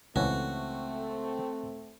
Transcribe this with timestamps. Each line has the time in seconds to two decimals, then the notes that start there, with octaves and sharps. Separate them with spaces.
0.16 C#2 E3 A3 C4 C#4 F#4